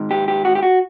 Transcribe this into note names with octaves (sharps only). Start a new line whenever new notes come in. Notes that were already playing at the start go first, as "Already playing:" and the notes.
Already playing: G#2 D#3
G4
G4
F#4
G4
F#4